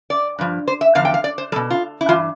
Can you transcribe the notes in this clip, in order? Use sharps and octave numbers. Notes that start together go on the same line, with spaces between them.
D5
G2 F3
C5
E5
E2 D3 F3 F5
G5
F5
D5
C5
G3 A4
B2
F4
E4
G2 E3 F4